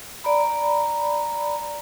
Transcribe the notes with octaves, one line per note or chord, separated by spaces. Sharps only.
D5 A#5 B5